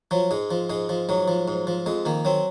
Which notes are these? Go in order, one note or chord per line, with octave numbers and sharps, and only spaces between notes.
F3 F#3
G#2 G#3
F3
G#2 G#3
F3
G#2 F#3
F3
G#2
F3
F2 G#3
D#3 A#3
F#3 C4